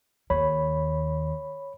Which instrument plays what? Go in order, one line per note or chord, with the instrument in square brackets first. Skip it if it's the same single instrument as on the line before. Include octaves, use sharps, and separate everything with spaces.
[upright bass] D#2 [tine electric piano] C#5 B5